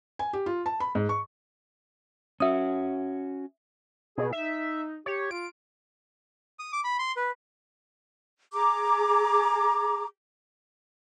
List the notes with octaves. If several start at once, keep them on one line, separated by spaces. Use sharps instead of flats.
G#5
G4
F4
A5
B5
G#2
C#6
C#4 F#4 E5 D#6
B2 G#4
D#4 E5
G4 C#5
F4 D7
D#6
D6
B5
C6
B4
G#4 A#5 D6